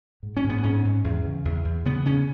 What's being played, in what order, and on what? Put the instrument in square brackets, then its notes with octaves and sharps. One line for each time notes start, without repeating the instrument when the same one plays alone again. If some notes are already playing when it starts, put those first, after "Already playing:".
[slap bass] G#2
C#4
G#2
B3
G#2 C#4
G#2
E2
C#3
E2
E2
C#3 B3
C#3 C#4